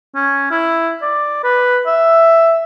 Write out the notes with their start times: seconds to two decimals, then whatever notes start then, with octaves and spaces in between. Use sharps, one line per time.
0.15 C#4
0.51 E4
1.02 D5
1.43 B4
1.86 E5